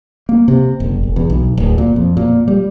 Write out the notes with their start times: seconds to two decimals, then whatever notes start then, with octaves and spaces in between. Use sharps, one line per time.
0.29 A#3
0.48 C3
0.80 F#1
1.03 E1
1.16 E2
1.30 B1
1.57 D1
1.78 A#2
1.96 F2
2.17 A#2
2.48 G3